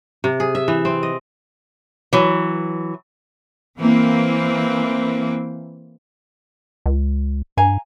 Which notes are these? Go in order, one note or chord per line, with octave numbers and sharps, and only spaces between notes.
C3
G#4
E5
E3
C4
D#5
E3 F#3
E3 A#3 C4
C#2
G2 F5 G#5 A#5